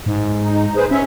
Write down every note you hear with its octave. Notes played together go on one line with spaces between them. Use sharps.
G#2
D#4
G#4 B4 C5
C#4 E5